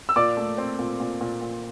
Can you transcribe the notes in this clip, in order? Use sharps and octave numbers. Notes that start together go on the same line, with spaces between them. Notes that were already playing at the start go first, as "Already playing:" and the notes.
E6
A#2 D5 D6
A3
C4
A#2
A#2
A#2
A#2